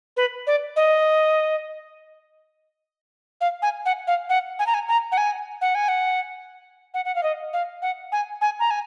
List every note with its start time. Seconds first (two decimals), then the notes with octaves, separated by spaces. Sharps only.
0.17 B4
0.47 D5
0.76 D#5
3.41 F5
3.62 G#5
3.86 F#5
4.07 F5
4.29 F#5
4.59 G#5
4.67 A#5
4.74 G#5
4.88 A#5
5.12 F#5
5.17 G#5
5.61 F#5
5.75 G#5
5.88 F#5
6.94 F#5
7.05 F#5
7.15 F5
7.23 D#5
7.53 F5
7.82 F#5
8.12 G#5
8.41 G#5
8.60 A#5
8.70 G#5